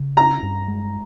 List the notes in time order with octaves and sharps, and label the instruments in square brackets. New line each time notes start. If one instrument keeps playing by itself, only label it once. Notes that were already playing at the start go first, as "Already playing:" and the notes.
Already playing: [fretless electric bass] C#3
[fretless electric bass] C#4 [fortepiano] A#5
[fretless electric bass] G2
G#3